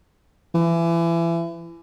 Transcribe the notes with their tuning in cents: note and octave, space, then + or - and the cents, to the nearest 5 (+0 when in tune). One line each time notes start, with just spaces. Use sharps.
E3 +30